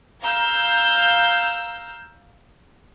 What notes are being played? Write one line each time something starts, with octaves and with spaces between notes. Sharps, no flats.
F5 A#5 E6 G6